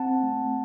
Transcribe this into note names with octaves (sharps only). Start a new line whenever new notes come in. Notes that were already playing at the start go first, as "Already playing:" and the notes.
Already playing: C4 F#5 A5
A3